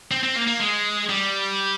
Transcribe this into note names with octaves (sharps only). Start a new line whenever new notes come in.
C4
C4
A#3
A#3
G#3
G3